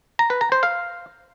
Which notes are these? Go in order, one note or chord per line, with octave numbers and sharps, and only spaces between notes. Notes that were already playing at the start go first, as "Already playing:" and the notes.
A#5
B4
A#5
C5
F5